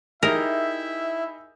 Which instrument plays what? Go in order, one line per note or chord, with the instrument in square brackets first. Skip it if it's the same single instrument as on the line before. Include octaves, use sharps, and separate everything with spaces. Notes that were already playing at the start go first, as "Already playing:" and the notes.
[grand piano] D#4 G4 G#4 [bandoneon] E4 [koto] A#4 [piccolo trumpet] E5